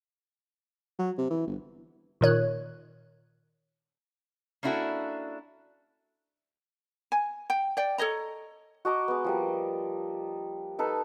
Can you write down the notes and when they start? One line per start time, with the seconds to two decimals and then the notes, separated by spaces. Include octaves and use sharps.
0.99 F#3
1.18 C3
1.30 E3
1.47 G1
2.21 A#2 D#3 C#5 F#6
4.63 A#3 C#4 D4 E4 F#4 A4
7.12 G#5
7.50 G5
7.77 D5 G5
7.98 A4 C#5 D#5 A#5
8.85 F#4 D#5 A#5 D6
9.08 G#3 B3
9.24 F3 G3 A#3
10.79 D#4 A4 B4